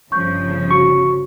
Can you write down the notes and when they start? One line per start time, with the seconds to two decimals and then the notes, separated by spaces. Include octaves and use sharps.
0.12 G1 C#3 F3 C#6 G6
0.71 F#4 C#6